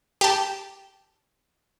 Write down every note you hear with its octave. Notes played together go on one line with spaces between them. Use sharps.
G4 A5